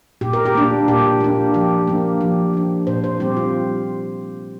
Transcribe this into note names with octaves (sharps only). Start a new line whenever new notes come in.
A#2 G4
A#4
G4
A#3 D4
A#2 G4
A#3 D4
F3 G4
A#3 D4
F3 G4
A#3 D4
A#2 C5
C5
G3 C4 G4
F4